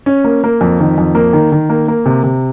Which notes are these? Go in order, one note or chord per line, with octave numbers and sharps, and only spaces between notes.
C#4
A#3
A#3
F2
D#3
F2
A#3
D#3
D#3
A#3
A#3
C3
C3